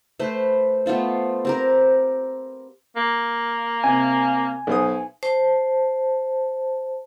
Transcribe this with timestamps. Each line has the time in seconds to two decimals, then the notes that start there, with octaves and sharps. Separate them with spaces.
0.19 A3 B4 C5
0.86 A3 B3 F4 C5
1.45 C4 G4 A#4
2.96 A#3
3.84 C3 G#5
4.67 B1 C5 D#6
5.23 C5 A5